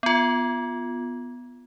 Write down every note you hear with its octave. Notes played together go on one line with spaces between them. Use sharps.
B3 F4